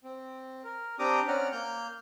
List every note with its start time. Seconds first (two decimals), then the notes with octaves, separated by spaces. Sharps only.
0.04 C4
0.64 A#4
0.99 C4 D4 G4 A#5 D6 D#6
1.28 C4 C#4 D5 F#5 A#5 F6
1.52 A#3 F6 G6